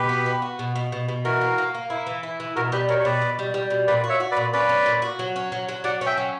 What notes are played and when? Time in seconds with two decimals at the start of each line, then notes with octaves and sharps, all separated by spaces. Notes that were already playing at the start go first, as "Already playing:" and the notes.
Already playing: B2 G4 B4
0.09 B3
0.26 B3
0.42 F#4
0.59 B2
0.76 B2
0.92 B2
1.09 B2
1.25 E3 F#4 A#4
1.41 A#3
1.58 A#3
1.75 A#3
1.90 E4
2.07 E3
2.23 E4
2.40 E3
2.56 B2 F#4 A#4
2.72 G3 G4 B4
2.89 B2 A#4 C#5
2.99 C#5
3.05 B2 B4 D5
3.22 B2
3.39 G3
3.54 G3
3.70 B2
3.87 A#2 B4 D5
4.04 F#4
4.09 C#5 E5
4.20 F#4
4.31 B4 D5
4.37 A#2
4.53 C#4 B4 D5
4.69 C#4
4.86 A#2
5.02 F#4
5.19 F#3
5.36 C#4
5.52 F#3
5.69 F#3
5.84 F#3 D5 F#5
6.01 C#4
6.06 E5 G5
6.18 F#3